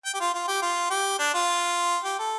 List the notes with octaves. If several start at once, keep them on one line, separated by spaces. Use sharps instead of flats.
G5
G4
F4
F4
G4
F4
G4
D4
F4
G4
A4